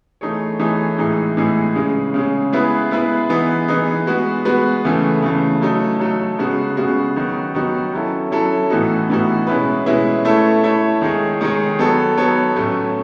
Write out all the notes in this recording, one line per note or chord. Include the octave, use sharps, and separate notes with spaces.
E3 A3 D#4 G#4 C#5
E3 A3 D#4 G#4 C#5
A2 E3 G#3 D#4 G#4
A2 E3 G#3 D#4 G#4
C#3 G#3 C#4
C#3 G#3 C#4
G#3 B3 E4 G#4 B4
G#3 B3 E4 G#4 B4
E3 B3 D#4 G#4
E3 B3 D#4 G#4
G#3 B3 F#4 B4
G#3 B3 F#4 B4
C#3 E3 A3
C#3 E3 A3
F#3 A3 D#4 A4
F#3 A3 D#4 A4
C#3 G#3 B3 F#4
C#3 G#3 B3 F#4
D#3 F#3 B3 D#4 F#4
D#3 F#3 B3 D#4 F#4
F#3 C#4 E4 A4
F#3 C#4 E4 A4
A2 E3 B3 D#4 F#4
A2 E3 B3 D#4 F#4
B2 G#3 C#4 E4 B4
B2 G#3 C#4 E4 B4
A3 E4 A4 C#5
A3 E4 A4 C#5
D#3 G#3 D#4 G#4 C#5
D#3 G#3 D#4 G#4 C#5
F#3 B3 D#4 A4 C#5
F#3 B3 D#4 A4 C#5
A2 F#3 A3 C#4